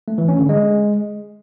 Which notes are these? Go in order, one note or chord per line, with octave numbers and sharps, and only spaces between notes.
A3
E3
C#4
D3
G#3